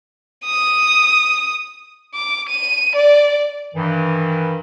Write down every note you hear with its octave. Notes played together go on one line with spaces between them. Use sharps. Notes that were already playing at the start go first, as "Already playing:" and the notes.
D#6
D6
D#7
D5
G2 D#3 E3